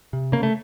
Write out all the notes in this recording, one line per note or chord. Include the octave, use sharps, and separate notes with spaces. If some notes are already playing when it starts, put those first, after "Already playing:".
C3
C#3 A#3
A3